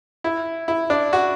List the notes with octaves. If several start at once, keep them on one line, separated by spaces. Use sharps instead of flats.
E4
E4
D4
F#4